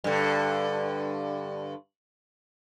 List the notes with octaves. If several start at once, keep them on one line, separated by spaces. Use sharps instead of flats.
G2 D3